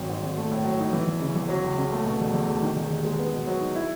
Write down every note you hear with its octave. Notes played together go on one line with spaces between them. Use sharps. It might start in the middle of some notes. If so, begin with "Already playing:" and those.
Already playing: G#1 F#3
G#2
G#1
A3
A2
F#3
D#4
E3
E2
C#3
E2
F#3
C#2
C#3
A3
B2
E1
E2
A3
D#3
E1
D#2
G#3
B3
B2
F#3
D#4
E4